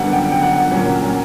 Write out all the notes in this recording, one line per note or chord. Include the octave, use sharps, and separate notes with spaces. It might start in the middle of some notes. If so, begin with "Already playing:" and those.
Already playing: F#2 D3 G3 B3 F#5
G5
G5
F#5
A#2 F#3 A#3 C#4